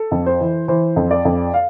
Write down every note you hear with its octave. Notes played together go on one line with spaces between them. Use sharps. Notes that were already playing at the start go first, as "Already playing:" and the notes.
Already playing: A4
F2
C5
E3
E3 C5
F2
D5
F2
F5